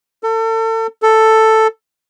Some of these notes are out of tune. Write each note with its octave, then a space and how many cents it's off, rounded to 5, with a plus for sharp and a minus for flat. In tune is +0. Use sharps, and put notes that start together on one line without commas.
A4 +35
A4 +5